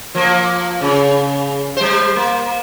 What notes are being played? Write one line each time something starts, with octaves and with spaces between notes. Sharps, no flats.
F3 A#3
C#3
G3 C5
A#3